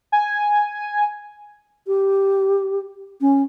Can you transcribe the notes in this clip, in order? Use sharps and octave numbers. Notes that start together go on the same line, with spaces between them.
G#5
G4
C#4